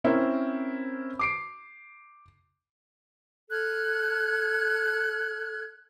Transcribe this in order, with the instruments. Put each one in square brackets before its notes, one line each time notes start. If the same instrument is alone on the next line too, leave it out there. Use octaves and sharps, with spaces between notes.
[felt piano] C4 C#4 E4 A#4 C5
D6 C7 D7
[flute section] A4 F6 F#6 G#6